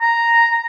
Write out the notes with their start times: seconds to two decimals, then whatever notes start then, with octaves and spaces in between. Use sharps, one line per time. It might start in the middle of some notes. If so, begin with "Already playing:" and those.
0.01 A#5